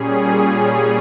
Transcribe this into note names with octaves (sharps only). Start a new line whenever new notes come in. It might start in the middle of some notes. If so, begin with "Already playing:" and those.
Already playing: A#2 G3 C#4 G#4
G#4